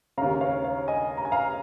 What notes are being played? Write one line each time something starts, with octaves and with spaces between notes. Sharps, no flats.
D#2 C#3 F5 A#5
C#5 F5
C#5 F5
D#5 G#5
A#5
G#5
F5 A#5